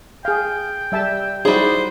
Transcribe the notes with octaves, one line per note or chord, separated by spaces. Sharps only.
G#4 F5 G5
G3 E5 A5
G3 D#4 E4 F#4 G#4 C5